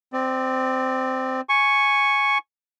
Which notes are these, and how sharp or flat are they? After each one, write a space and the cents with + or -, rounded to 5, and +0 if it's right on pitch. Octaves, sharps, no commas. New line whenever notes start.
C4 -10 D5 +25
G#5 +0 C#6 +0